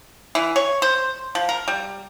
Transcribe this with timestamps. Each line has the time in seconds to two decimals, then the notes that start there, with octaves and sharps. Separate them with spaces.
0.35 E3
0.56 C#5
0.82 C5
1.35 F3
1.49 A#4
1.68 G3